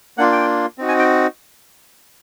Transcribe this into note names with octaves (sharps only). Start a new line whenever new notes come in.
A#3 D4 F4 F#5
G5
C4 D#4 F#4
G#5
G5